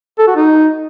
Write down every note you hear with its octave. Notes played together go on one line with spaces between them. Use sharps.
A4
F#4
D#4